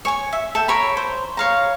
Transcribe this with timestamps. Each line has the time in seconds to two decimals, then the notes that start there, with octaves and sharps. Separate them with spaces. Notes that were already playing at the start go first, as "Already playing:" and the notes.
0.05 C#5 G#5 C#6
0.33 E5
0.55 A4 E5 G5
0.68 A#4 C#5 B5
0.97 C5
1.37 C#5 F5 A#5